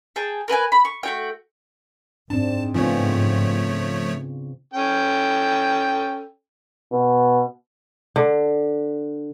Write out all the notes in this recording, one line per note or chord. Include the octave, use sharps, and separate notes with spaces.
G#4 G5 A5
A#4 B4 G5 G#5
B5
C#6
A3 F#4 G5
G#2 C4 D4 A5
C#3 F3 A3 B3 C4 F4 C#5
C#4 A4 G5
B2
D3